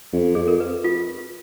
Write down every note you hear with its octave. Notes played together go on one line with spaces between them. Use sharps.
F2
F2 G#4
A#4
B4
F4